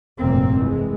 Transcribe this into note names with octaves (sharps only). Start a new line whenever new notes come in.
F1 B1 G2 A#2 A#3 C4
C2 E3 G#3